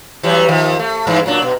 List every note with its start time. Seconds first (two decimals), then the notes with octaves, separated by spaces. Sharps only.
0.23 E3 F#3 G3
0.49 D#3 F3
0.79 A3
1.07 G2 E3
1.26 A#2 F#3 D4
1.42 B2